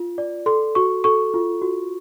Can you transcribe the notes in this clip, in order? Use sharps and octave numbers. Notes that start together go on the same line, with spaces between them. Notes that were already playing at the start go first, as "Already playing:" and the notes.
Already playing: F4
D5
A4 C6
F#4 C#6
A4 C#6
F4
F#4